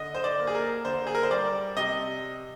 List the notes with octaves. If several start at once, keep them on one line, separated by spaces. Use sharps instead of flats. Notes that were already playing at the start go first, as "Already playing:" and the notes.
Already playing: D3 D#5
C5
D5
A#3
G#4
A#4
D3 C5
G#4
A#4
C5
G3 D5
C3 D#5